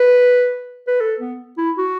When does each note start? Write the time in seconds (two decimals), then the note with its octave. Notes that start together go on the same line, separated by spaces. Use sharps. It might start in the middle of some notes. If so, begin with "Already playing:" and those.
Already playing: B4
0.87 B4
1.01 A4
1.20 B3
1.58 E4
1.78 F#4